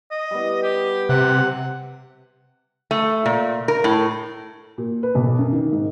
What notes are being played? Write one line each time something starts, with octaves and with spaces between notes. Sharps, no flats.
D#5
G3 B3
G4
C3 F#5
A3
A#2
A#4
A2
A#2
B4
B1
F#2
D#3
G#2